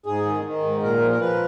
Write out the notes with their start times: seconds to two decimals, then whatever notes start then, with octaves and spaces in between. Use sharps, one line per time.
0.06 G#2 G#4
0.25 D#3
0.45 D#3
0.63 G#2
0.82 A#2 A#4
1.02 F3
1.11 A#4
1.20 F3 B4